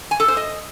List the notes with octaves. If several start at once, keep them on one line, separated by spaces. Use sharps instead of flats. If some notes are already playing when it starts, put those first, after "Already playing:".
G#5
A4
C5
D#5